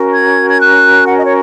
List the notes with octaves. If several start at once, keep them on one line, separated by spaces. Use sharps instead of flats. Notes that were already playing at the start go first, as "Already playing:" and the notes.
Already playing: C#4 F#4 A#4
G#6
G#6
F#6
F#5
D#5
C#5